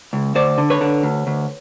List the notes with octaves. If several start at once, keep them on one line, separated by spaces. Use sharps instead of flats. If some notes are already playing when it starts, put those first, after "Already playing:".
C#2
D2 C5 D5
D3
B4 C#5
D3
D2
D2